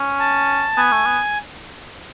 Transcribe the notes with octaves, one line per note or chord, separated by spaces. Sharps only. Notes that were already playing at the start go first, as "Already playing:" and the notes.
Already playing: C#4
A5
B3 G#5
A3
B3